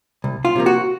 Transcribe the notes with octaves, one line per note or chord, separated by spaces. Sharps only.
C2
F4
C3 F3 A#3
F#4